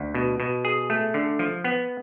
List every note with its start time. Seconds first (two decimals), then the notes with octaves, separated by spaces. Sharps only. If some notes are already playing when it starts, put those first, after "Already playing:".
Already playing: D2
0.14 B2
0.40 B2
0.65 G#4
0.90 A3
1.14 D3
1.39 F3
1.64 B3